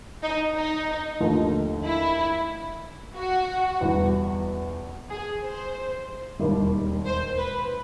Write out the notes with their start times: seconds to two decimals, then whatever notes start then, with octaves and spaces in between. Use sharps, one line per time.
0.23 D#4
0.55 D#4
1.20 D#2 D3 F3 A3
1.85 E4
3.15 F#4
3.81 E2 B2 G3
5.10 G#4
5.43 C5
6.39 E1 D#2 D#3 G3
7.06 C5
7.37 B4